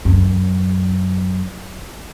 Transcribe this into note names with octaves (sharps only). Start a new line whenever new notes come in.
F#2